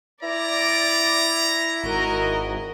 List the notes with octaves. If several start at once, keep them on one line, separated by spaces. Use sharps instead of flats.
E4 D5 A#5
G#1 F#4 A#4 D#5